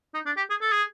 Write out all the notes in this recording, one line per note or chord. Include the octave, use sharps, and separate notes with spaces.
D#4
D4
G4
G#4
A4
G#4